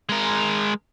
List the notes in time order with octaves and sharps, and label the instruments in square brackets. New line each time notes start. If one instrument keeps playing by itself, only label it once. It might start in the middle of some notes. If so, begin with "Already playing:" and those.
[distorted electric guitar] G#3 A#4